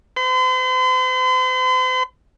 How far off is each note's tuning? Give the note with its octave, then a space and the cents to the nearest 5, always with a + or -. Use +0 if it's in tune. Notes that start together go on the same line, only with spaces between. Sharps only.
C5 -40 C6 -45